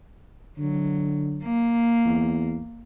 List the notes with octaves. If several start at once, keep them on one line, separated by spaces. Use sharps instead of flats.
D3 F#3
A#3
E2